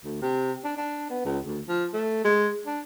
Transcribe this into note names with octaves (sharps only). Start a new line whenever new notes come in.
D2
C3
D4
D4
B3
C#2
D2
F3
A3
G#3
D4